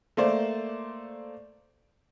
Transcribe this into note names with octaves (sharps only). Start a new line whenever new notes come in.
A3 A#3 C5 D5